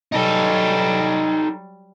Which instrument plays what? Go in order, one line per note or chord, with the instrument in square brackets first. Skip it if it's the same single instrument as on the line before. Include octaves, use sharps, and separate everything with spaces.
[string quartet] F#3 G3 [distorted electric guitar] D#4 A4